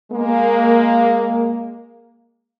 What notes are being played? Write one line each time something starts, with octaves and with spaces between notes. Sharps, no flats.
G#3 A#3